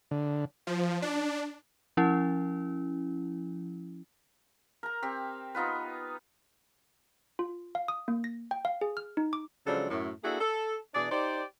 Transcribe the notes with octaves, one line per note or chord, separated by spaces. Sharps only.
D3
F3
D4
F3 C#4 E4
A#4 A#5
C4 G4
B3 D#4 F4 B4
F4
F5
D#6
A#3
A#6
G5
F5
G#4
F6
D#4
D6
C#3 F3 F#3 G#3 D4 A4
F#2 A2
A#3 D4 E4 F#4 G#4 A4
A4
B2 E3 D4 G#4 D5
D#4 G4 C5 D5